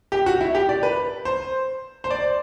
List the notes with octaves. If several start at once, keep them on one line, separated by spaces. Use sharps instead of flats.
G4
F#4
E4
G4
D5
B4
C5
C5
D5